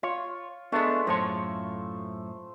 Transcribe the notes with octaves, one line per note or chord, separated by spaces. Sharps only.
F4 C#5
G#3 A3 B3 D4
F#2 A2 C5 C#5 A5